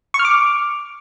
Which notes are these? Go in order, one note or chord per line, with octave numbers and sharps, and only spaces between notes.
C#6
F6
D6